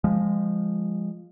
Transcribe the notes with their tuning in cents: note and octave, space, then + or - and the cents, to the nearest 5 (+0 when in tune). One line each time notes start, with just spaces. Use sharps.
F3 +0 G#3 -20